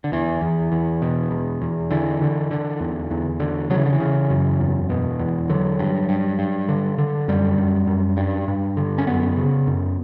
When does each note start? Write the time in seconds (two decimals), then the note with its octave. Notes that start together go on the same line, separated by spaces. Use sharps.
0.04 D3
0.12 E2 E3
0.42 E2
0.72 E2
1.02 B2
1.31 E2
1.62 E2
1.91 D3 E3
2.21 D3
2.51 D3
2.80 E2
3.11 E2
3.40 D3
3.70 C#3 F#3
3.78 E3
3.85 D3
3.93 E3
4.00 C#3
4.30 F#2
4.60 E2
4.90 B2
5.19 E2
5.49 D3 F#3
5.79 G2
6.09 G2
6.39 G2
6.69 D3
6.98 D3
7.28 F#2 G3
7.58 F#2
7.87 F#2
8.17 G2
8.48 G2
8.77 D3
8.98 C#4
9.07 F#2 B3
9.37 C#3
9.67 F#2